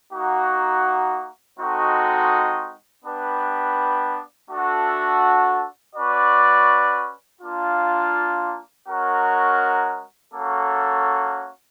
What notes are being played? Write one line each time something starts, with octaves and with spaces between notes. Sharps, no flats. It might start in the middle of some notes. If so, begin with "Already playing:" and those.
A#3 D#4 F#4
G#3 C4 D#4 F#4 A4
B3 D4 G4 B4
A3 D4 F#4 A4
C#4 F#4 B4 D5
A#3 D4 F4
G#3 C#4 F#4 A#4
A#3 C#4 F#4 A4